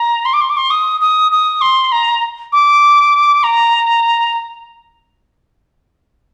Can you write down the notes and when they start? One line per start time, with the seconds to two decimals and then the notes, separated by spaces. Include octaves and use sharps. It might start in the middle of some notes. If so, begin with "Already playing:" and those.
Already playing: A#5
0.25 C6
0.33 D6
0.41 C6
0.49 D6
0.57 C6
0.70 D#6
1.00 D#6
1.31 D#6
1.61 C6
1.92 A#5
2.52 D6
3.43 A#5